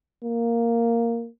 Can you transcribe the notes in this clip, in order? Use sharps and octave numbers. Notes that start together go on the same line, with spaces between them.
A#3